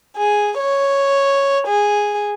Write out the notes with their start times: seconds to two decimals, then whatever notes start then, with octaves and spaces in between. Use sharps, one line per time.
0.16 G#4
0.58 C#5
1.67 G#4